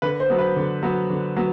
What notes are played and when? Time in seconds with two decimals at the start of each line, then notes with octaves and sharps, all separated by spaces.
0.02 D3 B4
0.20 C5
0.30 F#3 B3
0.38 B4
0.56 D3
0.83 F#3 B3
1.10 D3
1.37 F#3 B3